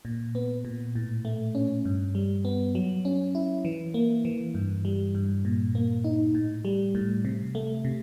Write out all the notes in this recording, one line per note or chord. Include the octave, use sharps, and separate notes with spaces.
A#2
B3
A#2
A2
A3
C#4
G2
G3
B3
F#3
C#4
E4
E3
A#3
E3
G2
G3
G2
A#2
A#3
D#4
A2
G3
A2
C3
A3
C3